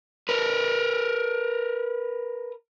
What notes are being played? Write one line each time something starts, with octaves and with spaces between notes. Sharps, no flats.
A#4 B4